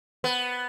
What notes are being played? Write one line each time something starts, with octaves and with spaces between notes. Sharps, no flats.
B3